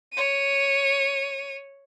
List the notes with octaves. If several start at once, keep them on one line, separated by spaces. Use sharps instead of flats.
C#5 D#7